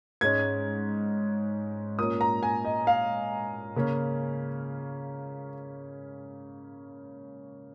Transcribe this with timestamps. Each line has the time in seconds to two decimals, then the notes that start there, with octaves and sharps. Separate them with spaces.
0.21 G#2 G#3 C#4 G#6
1.99 A#2 A#3 C#4 D#6
2.21 A#5
2.43 G#5
2.65 D#5
2.87 F5
3.76 C#3 A#3 C#4